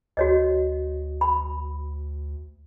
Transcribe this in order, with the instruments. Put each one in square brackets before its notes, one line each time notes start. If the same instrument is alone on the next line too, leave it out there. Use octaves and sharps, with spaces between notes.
[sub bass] D2 [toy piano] F#4 C#5 D#5
[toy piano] B5